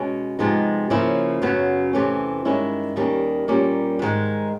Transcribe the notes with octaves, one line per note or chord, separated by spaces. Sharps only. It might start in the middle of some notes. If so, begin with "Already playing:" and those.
Already playing: B2 G#3 C#4
C3 F3 G#3 B3 D#4
C#3 F3 A#3 C#4 E4
F#2 C#3 F#3 B3
E2 C3 E3 A3 C#4
G2 D#3 G#3 C#4 E4
D#2 D#3 G3 A#3 C#4
A#2 G3 A#3 C#4
G#2 D#3 G#3